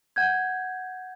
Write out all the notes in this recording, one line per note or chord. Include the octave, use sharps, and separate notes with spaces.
F#5 G6 G#6